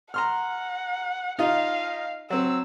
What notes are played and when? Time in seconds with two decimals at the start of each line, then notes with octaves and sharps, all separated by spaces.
0.14 F#5 A#5 C6 F6
1.39 D#4 F4 D#5 F5
2.30 F#3 C4 E6